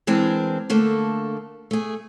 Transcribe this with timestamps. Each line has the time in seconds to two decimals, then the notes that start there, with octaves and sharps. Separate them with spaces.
0.07 E3 G#3 C4 D4 A#4
0.70 D3 A3 A#3 A4
1.71 A3 G#4